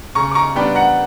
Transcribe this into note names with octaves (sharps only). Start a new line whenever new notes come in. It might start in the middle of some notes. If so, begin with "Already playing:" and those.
C#3 A#5 C#6
D6
A#5 C#6
G3 B3 D4 G5 B5
F#5 A#5